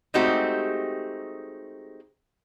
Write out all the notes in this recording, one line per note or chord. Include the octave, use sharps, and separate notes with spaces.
G#3 A3 C4 D#4 F#4 G4